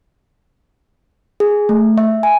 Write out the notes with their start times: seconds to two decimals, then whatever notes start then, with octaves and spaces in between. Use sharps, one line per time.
1.40 G#4
1.69 A3
1.98 E5
2.23 G#5